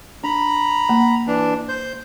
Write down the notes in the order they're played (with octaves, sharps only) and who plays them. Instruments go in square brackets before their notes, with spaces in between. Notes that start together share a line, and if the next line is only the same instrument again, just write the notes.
[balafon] D4 [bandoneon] A#5 B5
[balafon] A#3
[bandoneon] E3 D4
C5 G6